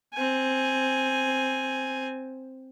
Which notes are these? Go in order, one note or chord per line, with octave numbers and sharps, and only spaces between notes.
C4 G#5